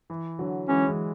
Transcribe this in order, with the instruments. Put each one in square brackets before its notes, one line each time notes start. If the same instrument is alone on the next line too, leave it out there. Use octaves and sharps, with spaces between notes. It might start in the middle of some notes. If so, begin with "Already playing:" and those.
[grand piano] E3
D3 F#3
[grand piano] E3 G#3 [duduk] C#4
[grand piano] E3 G#3